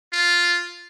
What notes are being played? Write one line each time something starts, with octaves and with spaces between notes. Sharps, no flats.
F4